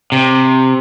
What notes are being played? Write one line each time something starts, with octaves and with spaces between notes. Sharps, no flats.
C3